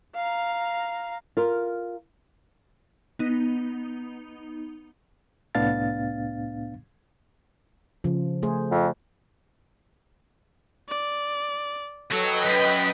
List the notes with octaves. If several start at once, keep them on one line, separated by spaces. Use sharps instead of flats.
F5 A#5
F4 A#4
B3 D#4
C2 A2 B3 D4 F5 A6
C#3 F3
A3 G#4 C5
F2
D5
F#3 F#4 A4 B4 C#5 D#5 G5
F#2 B6